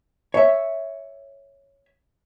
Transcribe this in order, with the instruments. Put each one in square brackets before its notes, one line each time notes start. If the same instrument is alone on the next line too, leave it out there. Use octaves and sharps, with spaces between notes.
[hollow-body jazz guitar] C#5 E5